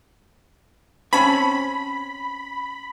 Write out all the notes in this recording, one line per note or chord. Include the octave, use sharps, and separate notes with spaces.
C4 C#4 A5 B5